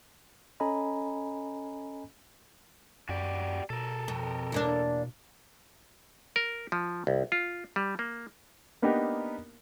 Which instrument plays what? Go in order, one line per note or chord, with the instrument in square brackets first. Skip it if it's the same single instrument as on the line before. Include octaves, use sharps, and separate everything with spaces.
[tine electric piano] C#4 A4 D#5 G#5 A#5 B5
[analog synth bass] F#2 [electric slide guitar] F#4 G4 D5
[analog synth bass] B2 [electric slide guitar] A4 A#4
[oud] F2
E2 A#3 D4
[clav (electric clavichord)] A#4
F3
C2
F4
G3
A#3
[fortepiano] A#3 B3 D4 D#4 G4 A#4